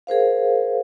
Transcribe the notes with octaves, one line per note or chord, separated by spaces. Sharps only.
G#4 A#4 C5 F5